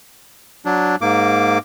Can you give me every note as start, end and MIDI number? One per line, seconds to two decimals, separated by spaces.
0.65 0.96 54
0.65 0.96 62
1.01 1.58 44
1.01 1.58 58
1.01 1.58 86